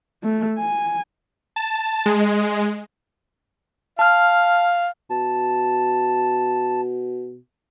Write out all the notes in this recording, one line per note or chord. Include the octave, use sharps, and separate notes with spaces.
A3
G#5
A5
G#3
F5 A5 F6
B2 A5